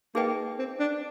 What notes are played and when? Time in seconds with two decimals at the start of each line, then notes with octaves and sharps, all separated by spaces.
0.15 A#3 D#4 G#4 B4 D#5 G5
0.59 C4
0.80 D4